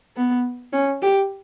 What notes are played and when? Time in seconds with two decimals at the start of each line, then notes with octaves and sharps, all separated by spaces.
0.17 B3
0.73 C#4
1.02 G4